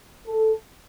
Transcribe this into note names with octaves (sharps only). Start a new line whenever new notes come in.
A4